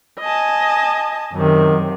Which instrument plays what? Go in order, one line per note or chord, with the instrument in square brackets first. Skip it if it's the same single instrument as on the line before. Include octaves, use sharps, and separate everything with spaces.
[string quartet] D#5 G#5 A5
[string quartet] F#2 C3 [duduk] D#3